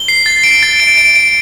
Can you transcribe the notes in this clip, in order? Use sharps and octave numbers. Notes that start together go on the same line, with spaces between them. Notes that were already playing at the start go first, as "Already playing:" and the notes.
Already playing: G7
C7
A6
D7
A6
D7
D7
D7